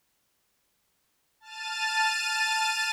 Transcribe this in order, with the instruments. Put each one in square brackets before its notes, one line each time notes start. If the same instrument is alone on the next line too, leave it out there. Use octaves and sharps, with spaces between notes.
[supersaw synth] A5 F6 A6 D#7